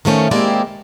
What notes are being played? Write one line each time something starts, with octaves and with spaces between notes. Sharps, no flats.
D#3 F3 A3 C#4
G#3 A#3 C4 E4 G4 D5